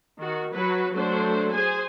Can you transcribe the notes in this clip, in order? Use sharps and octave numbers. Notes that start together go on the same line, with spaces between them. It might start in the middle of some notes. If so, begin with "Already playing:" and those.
D#3 F#4
F#3 F#4 B4
F#3 A3 D4 C5
G#4 C5 G#5